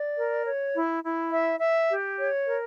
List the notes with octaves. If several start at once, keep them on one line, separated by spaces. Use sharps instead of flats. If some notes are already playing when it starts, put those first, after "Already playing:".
Already playing: D5
A#4
C#5
E4
E4
E5
E5
G4
C#5
A#4